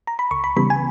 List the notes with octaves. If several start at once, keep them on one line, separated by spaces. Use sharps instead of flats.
A#5
B5
C#2 C#6
B5
C#3 E3 G3 B3 B5
G#5